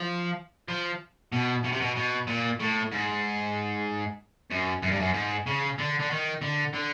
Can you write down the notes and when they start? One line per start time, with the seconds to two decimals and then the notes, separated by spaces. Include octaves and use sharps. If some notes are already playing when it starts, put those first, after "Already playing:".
Already playing: F3
0.68 F3
1.32 B2
1.64 B2
1.72 C3
1.80 B2
1.96 B2
2.27 A#2
2.60 A2
2.92 G#2
4.50 F#2
4.82 F#2
4.91 G2
5.00 F#2
5.14 G#2
5.47 C#3
5.78 D3
5.99 D3
6.10 D#3
6.42 D3
6.74 D3